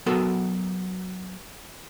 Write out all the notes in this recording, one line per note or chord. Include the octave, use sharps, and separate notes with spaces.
F#3 B3 F#4 A4 A#4